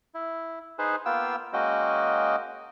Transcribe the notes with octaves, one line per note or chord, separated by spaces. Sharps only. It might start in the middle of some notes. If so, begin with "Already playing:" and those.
E4
D#4 G#4 B4 C5
A#3 B3 F4 G5 E6
G#3 A#3 C#4 F#4 D#5 G5